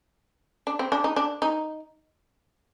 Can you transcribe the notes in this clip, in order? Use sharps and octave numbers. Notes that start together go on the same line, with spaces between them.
D4
C4
D4
D#4
D4
D#4